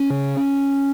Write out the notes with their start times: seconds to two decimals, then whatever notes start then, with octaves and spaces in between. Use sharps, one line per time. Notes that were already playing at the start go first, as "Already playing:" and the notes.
Already playing: C#4
0.10 C#3